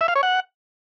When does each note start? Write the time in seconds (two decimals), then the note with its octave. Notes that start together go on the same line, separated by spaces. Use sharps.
0.01 E5
0.08 F5
0.16 C#5
0.23 F#5